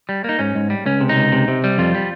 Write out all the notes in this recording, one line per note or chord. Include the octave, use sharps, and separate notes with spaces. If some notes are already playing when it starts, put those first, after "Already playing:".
G3
A#3 D#4
G#2 C#4
G#2
G3
C#2 C#4
C3
D#4
C#2
C3
C3
G3
F2 F4
G3